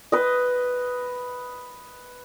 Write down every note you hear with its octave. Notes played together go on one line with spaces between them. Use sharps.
B4 D#5